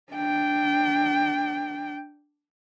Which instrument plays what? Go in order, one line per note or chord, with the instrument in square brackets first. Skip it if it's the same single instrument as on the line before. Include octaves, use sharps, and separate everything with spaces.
[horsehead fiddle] D4 G5